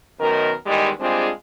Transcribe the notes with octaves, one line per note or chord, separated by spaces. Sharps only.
F#2 B2 D#3 A#4
E2 D#3 G3 G#3
G3 G#3 C4 D4 F4 G#4